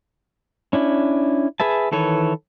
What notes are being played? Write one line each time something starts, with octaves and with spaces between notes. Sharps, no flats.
C#4 D4 E4
G#4 B4 E5 A5
D#3 E3 A4 B4 C#5